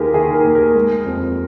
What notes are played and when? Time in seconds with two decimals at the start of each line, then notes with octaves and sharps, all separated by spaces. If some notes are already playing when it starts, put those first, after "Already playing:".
Already playing: D#2 D#3 G4 G#4 A#4
0.14 D#3 G#4
0.34 A#4
0.44 D#2
0.55 A#4
0.75 G#3
1.05 F2